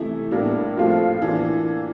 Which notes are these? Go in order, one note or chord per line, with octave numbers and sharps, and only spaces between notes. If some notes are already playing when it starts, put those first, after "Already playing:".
Already playing: C3 E3 A3 E4
A2 G3 A#3 D4
A2 F3 A3 C4 F4
E3 A#3 D4